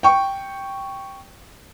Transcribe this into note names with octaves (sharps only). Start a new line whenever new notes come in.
G5 C#6